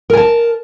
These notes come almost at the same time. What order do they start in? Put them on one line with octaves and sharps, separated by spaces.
A#4 G#5 A5